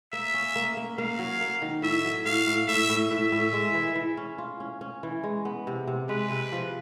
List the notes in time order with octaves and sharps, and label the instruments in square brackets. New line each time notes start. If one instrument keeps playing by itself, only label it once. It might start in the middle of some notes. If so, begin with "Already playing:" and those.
[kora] A#3 [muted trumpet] E5
[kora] C#4
A#3
A#3
[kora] A#3 [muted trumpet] F5
[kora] F#3
A#3
D#3
[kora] A2 [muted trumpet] E5
[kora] F#3
[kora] A2 [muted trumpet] F5
[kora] A2
[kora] A2 [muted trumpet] E5
[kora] A2
[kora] A2 [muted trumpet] E5
[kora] A2
G#3
E3
E3
C#4
F4
C#4
C#4
E3
G#3
B3
C3
C3
[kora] G#3 [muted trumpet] B4
[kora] C3
F3